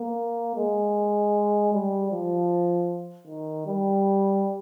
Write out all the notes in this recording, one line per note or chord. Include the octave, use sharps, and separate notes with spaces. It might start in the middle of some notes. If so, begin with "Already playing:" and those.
Already playing: A#3
G#3
G3
F3
D#3
G3